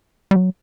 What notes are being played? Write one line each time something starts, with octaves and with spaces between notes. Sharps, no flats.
G3
F#3